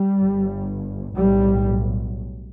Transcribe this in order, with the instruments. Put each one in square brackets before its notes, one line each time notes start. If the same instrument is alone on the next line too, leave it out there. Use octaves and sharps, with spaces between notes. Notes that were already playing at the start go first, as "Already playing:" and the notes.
Already playing: [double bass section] G3
G1 G2
B1 A2 G3